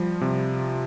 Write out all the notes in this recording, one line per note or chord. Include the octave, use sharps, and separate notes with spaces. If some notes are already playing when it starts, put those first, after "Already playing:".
Already playing: F3 G3
C3